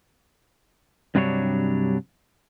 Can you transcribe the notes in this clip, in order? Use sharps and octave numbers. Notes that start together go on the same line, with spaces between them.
G2 C3 F#3 G3 D4 C#5